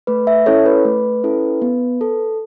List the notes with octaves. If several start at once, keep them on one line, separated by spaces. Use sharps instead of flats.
A3 B4
E5
C#4 E4 A4 C#5
B4
A3
C#4 E4 A4
B3
A4